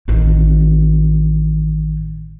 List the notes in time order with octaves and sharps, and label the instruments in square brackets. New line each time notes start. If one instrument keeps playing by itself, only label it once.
[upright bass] A1 D#3